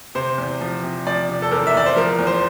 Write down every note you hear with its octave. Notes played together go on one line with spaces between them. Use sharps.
C3 C5
E2
F3
C3
F3 D5
C3
A4
E2 A#4
E5
E2 D5
C5
F3 A#4
E2
C5